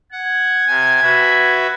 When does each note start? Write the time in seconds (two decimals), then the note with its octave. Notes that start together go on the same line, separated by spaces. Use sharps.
0.12 F#5 G#6
0.68 C3 G#5
1.02 F#4 B4 E5